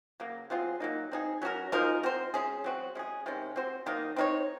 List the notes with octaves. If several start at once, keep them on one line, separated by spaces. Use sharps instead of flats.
C#3 F#3 A#3
F#3 C4 F4 G#4
F#3 A#3 D#4
C4 D#4 G#4
F#3 C#4 F#4 A#4
F3 G#3 D#4 A#4
C4 F#4 C5
G#3 C#4 G#4
F#3 C4 F#4
G#3 C#4 G#4
C3 D#3 G#3 C#4
C4 F#4 C5
D#3 F#3 A#3 D#4
C4 D#4 A#4 C#5